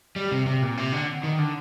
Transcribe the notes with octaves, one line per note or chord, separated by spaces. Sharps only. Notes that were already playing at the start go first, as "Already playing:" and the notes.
G3
C3
C3
A#2
C3
D3
D#3
D3